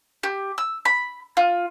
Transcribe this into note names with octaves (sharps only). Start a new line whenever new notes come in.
G4
E6
B5
F4